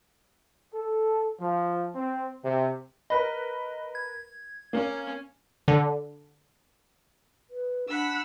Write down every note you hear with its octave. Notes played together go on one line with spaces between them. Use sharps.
A4
F3
C4
C3
A#4 B4 D#5 B5
G#6
A#3 C#4
D3
B4
D4 F#5 B5 E6